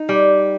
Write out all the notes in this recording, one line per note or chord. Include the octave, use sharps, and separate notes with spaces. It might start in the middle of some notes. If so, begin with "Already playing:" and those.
Already playing: D#4
G3